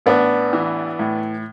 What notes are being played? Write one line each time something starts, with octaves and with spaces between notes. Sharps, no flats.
A1 B3 D4
E3
A2